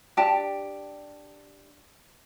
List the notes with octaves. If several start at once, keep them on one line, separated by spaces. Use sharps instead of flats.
D4 G4 A5